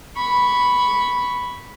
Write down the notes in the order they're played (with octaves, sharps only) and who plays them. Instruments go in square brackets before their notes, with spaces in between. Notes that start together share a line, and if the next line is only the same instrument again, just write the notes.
[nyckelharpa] B5 C#6